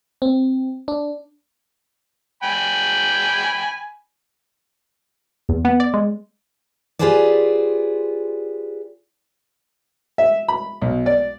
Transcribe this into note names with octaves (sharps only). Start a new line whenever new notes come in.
C4
D4
G5 G#5 B5
E2
B3
D5
G#3
F4 G4 G#4 B4 C5 D5
E5
B5
B1
D5